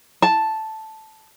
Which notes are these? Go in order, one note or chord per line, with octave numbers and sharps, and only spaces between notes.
A5